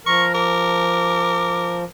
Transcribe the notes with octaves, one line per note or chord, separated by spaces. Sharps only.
F3 A#4 C#6
A#4 D6